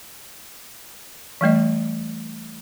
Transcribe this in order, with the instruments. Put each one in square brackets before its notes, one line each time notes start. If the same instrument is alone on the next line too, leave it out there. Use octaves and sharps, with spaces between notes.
[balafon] E3 G3 A3 D#5